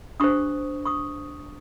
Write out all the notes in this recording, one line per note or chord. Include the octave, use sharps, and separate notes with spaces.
D4 G4 C5 C#6 D#6
C#6 D#6